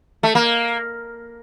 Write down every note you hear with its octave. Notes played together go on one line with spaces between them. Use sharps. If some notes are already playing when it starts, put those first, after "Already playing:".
A3
A#3